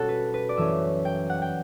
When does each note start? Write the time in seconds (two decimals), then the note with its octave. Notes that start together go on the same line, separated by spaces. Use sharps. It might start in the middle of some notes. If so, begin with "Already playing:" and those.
Already playing: B2 G3 C#4 F#4 A4
0.09 B4
0.34 B4
0.49 D5
0.56 F#2 E3 A3 C#4 E5
1.05 G5
1.30 F#5
1.42 G5